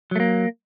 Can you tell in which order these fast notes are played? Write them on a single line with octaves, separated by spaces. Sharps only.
F#3 A3 A#3